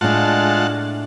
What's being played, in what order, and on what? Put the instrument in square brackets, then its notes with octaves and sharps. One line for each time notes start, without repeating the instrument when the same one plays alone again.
[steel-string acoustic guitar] A2 D4 [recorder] G#3 [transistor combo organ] F4 F#5 A5